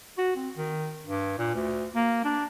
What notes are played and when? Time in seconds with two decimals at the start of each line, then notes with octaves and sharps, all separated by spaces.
0.18 F#4
0.36 C4
0.57 D#3
1.06 G2
1.38 A#2
1.55 D2
1.95 A#3
2.25 D4